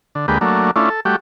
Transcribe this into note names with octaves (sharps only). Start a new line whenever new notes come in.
D3
D2 G#3 A#3 G4 B4
F#3 A3 A#3 D4
A3 C#4 D4 E4 F4
A4
G3 A3 F#4 G4